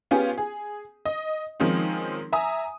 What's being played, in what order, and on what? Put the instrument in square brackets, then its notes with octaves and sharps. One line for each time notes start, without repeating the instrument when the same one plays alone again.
[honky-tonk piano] B3 C#4 F4 G4 G#4
G#4
D#5
D#3 F3 G#3 C4 C#4 D#4
E5 G#5 A#5 D#6